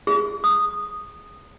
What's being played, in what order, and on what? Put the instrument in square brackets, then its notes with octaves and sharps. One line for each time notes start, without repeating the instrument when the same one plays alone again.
[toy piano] G#4
D#6